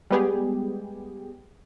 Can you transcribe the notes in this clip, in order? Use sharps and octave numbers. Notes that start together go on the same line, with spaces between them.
G3 G#3 B3 G4 G#4